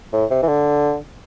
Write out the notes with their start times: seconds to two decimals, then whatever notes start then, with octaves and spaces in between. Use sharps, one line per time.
0.13 A2
0.31 C3
0.42 E3
0.48 D3